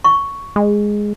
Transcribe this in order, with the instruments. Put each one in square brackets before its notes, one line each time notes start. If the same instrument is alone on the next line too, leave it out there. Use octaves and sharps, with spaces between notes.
[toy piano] C#6
[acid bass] G#3